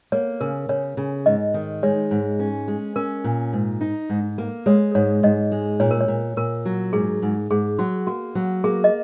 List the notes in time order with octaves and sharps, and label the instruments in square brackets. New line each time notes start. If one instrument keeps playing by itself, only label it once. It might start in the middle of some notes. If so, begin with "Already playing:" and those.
[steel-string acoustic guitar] A#3 [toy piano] C#5
[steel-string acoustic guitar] C#3 [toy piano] A#4
[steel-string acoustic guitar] C#3 [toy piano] C#5
[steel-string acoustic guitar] C#3
[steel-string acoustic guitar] G#2 [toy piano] D#5
[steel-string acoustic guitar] D#3
[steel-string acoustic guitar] G#3 [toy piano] C#5
[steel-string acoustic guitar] G#2
C#4
G#3
[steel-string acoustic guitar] C#4 [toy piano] A#4
[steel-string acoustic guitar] A#2
G#2
D#4
G#2
A#3
[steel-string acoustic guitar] G#3 [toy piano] C#5
[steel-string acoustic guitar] G#2 [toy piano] C#5
[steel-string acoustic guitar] G#2 [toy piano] D#5
[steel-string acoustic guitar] G#3
[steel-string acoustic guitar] A#2 [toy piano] C#5
[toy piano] A#4
C#5
[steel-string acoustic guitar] A#2
[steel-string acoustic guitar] A#2 [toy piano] A#4
[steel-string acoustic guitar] F#3
[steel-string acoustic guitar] G#2 [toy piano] G#4
[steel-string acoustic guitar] G#2
[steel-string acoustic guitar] G#2 [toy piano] G#4
[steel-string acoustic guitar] F#3 [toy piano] F#4
[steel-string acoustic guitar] A#3 [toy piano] F#4
[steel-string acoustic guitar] F#3
[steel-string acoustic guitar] A#3 [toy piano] G#4
[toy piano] D#5